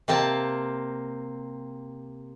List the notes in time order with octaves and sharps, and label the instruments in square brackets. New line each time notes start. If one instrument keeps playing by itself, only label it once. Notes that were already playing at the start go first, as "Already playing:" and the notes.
[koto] C3 A#3 C4 A5